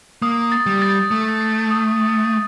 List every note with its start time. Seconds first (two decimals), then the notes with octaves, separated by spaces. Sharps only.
0.22 A#3 D#6
0.52 A6
0.66 G3
0.82 A6
1.11 A3 D#6
1.40 C7
1.71 D#6